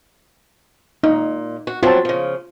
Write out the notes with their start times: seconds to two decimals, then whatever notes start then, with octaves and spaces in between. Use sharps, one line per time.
1.03 A#2 D#4
1.67 F#4
1.83 F#3 C4 F4 A5
2.05 C#3 F3